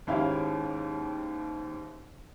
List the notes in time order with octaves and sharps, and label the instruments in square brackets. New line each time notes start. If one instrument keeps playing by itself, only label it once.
[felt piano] D#2 G#2 C#4 E4 G4 F5